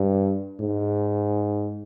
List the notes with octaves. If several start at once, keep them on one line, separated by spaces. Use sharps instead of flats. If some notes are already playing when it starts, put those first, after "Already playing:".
Already playing: G2
G#2